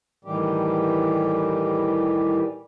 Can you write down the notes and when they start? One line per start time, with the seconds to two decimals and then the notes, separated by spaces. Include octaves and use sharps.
0.25 A2 D#3 E3 G3 G4